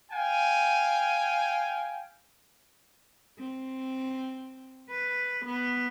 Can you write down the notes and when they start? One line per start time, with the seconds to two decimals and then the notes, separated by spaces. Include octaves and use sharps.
0.11 F5 G5 G#5
3.38 C4
4.90 B4
5.44 B3